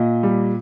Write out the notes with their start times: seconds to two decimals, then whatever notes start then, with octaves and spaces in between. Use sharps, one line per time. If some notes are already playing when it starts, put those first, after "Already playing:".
Already playing: A#2 D#5
0.23 G3